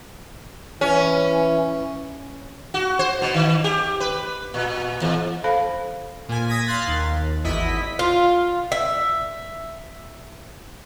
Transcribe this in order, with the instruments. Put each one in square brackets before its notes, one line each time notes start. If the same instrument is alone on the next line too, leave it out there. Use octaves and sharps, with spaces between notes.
[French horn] E3 [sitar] C#4
[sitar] F#4
C5
B2
D#3
G4
B4
A#2
E2
[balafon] A4 C5 F5 A5 B5
[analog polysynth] A#2 G#5
D#6 G#6 A#6 B6
F5 C6 F#6 A6
D#2
G#1 E2 E4 D#5 B6
[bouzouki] F4
E5